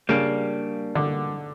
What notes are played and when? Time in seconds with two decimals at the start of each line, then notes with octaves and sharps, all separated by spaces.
0.09 C#3 G3 A#3 D4
0.95 D3